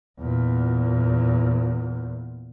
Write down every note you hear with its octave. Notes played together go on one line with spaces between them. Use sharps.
E2 A#2